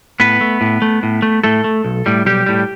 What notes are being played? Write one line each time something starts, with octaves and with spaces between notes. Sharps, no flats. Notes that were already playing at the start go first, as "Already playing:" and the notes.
A2 B3 B4
A3
A2
A3
A2
A3
A2 A3 A4
A3
B1
A2 G3
B1 G3 G4
A2 G3